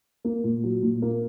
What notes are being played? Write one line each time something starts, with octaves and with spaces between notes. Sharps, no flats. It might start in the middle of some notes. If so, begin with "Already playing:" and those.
A#3
A#2
F#3
A#2
A#3